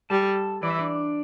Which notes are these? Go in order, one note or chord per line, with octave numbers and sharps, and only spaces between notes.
G3 A4 A5
E3 D5
E5
D4 D5